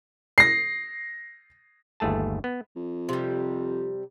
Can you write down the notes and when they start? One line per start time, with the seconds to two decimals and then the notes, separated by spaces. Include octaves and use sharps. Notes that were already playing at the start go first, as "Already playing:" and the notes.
0.38 A#6 C7
2.00 G1 D#2 A3 G#4 A5
2.44 B3
2.76 F2
3.09 C3 G3